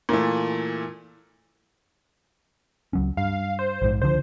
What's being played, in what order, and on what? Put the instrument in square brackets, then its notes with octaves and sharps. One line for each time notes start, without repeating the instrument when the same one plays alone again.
[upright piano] A#2 E3 A3
[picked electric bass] C#2 F#3 C#4
[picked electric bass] G2 [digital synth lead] F5
[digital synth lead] C5
[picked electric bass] A#1 G#2
[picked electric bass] C#2 D3 F3 [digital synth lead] C5